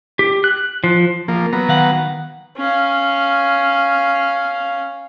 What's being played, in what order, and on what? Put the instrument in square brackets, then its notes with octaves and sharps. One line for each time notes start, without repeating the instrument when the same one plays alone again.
[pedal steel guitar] G4
F#6
F3
[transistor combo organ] F3 A#3
F#3 B3 A#5
[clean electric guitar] D#3 F5 F#5
[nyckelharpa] C#4 F5